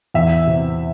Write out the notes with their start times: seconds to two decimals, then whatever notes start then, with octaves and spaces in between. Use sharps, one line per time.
0.14 E2 E5
0.47 C3